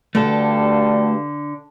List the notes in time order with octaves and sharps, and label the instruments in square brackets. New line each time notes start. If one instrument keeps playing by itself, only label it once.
[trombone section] G2 [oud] D3 [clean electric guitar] A3 F#4 A4